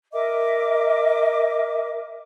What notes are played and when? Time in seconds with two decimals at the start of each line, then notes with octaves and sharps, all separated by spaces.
0.13 A#4 D#5 E5 D6